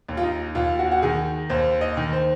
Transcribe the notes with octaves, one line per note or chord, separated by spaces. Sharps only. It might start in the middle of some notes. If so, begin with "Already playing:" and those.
D#2
F4
D#4
D#2 F4
F#4
F#4
D#3 G#4
D#2 C5
D#5
D#3
C5